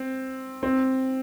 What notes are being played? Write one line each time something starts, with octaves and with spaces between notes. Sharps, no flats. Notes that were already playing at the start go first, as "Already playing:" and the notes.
Already playing: C4
C4